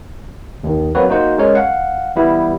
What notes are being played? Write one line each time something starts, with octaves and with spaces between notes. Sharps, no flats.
D#2 D#3
F#3 A#3 C4 F#4 B4 C#5
A#3 D#4 F#4 C5 F#5
G#3 C#4 A#4 C#5
F5 F#5
E3 G3 B3 E4